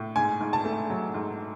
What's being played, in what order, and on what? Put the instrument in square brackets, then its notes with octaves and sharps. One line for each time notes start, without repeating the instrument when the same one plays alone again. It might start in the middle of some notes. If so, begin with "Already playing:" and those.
Already playing: [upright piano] A2
G#2 G#5
G#2
A5
A3
F#3
G#2